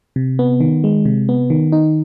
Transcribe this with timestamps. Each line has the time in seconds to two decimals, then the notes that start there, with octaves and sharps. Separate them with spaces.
0.16 C3
0.39 B3
0.60 D#3
0.84 G#3
1.05 C3
1.29 B3
1.50 D#3
1.72 D#4